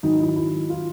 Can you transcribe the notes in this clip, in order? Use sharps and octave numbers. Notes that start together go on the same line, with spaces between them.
G#2 D#3 F#3 D#4
E4
E4
F4